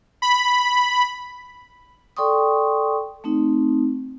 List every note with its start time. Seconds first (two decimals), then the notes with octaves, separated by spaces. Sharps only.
0.22 B5
2.17 A4 D5 G5 C6 C#6 D#6
3.24 A3 C4 D#4